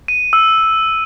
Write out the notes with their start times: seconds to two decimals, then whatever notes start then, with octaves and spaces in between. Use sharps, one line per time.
0.08 D#7
0.33 E6